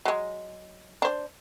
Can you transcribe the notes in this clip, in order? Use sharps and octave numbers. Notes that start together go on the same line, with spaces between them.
F#3 G#3
D4 C5